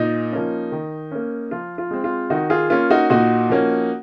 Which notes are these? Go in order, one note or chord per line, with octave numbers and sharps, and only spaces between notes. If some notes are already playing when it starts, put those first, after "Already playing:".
Already playing: A#2 D#4
F3 A#3 C#4
D#3
A#3 C#4
F3 F4
F4
G#3 C4
F4
D#3 D#4 F#4
F4 G#4
A#3 C#4 F4
D#4 F#4
A#2 D#4 F#4
F3 A#3 C#4